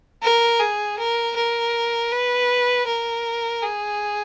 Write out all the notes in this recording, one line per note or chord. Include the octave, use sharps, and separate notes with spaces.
A#4
G#4
A#4
A#4
B4
A#4
G#4